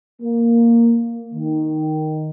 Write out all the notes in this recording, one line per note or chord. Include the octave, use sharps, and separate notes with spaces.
A#3
D#3